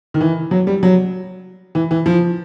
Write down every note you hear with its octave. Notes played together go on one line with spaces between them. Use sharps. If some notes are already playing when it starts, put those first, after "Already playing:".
D#3
E3
F#3
G3
F#3
E3
E3
F3